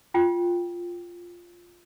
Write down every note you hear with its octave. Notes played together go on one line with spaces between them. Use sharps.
F4 G5